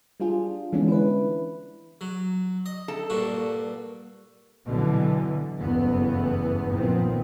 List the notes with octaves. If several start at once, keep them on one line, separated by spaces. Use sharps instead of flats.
G3 D4 F4 G#4
D3 E3 G#3 B3 C#4 D4
E4 B4
F#3
D#5
A4
G2 A#2 F#4
B2 D3 E3 F#3
F#1 E2 G2 E3 A3 B3
A#2 D#3 F3 B3 C4